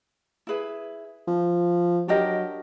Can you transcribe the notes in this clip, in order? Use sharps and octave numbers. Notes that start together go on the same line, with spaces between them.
E4 G#4 B4 E5
F3
F#3 D4 G4 A#4 D#5